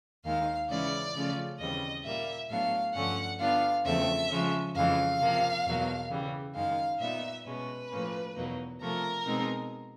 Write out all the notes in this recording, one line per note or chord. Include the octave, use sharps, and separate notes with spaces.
D#2 D#3 G#3 F5
C#3 E3 G#3 C#4 E4 D5
C#3 F3 A3 C#4 F4
D#2 C#3 E3 G3 C4 D#5
A#2 G3 A#3 E5
A2 F#3 B3 D4 F5
G2 D3 F3 A3 C#4 F#5
D3 G3 B3 D4 F4 F5
E2 C#3 F3 A3 C4 E5
C#3 F3 G#3 C#4
F2 C#3 E3 G#3 F5
C3 F3 A#3
E2 B2 F#3 A#3
C#3 E3 G3
F#2 D#3 G#3 F5
A#2 G3 B3 D#4 E5
B2 G#3 C#4 B4
A2 F3 A#3 C#4
E2 B2 F#3 A#3 D#4
C3 F3 A3 A#4
B2 G#3 C4 D#4